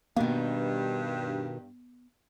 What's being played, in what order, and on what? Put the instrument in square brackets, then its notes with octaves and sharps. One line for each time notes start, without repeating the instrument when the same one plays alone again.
[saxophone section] G2 [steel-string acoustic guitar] B2 D#3 [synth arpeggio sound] A#3 [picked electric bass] B3